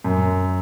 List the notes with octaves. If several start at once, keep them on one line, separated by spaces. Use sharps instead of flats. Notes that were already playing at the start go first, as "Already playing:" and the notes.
F#2